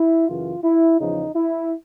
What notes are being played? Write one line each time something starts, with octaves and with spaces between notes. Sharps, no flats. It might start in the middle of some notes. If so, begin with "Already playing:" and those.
Already playing: E4
F#2 C#3 E3 F4
E4
E2 C#3 F3 D#4
E4